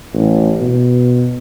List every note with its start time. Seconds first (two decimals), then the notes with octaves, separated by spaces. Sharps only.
0.14 A1
0.60 B2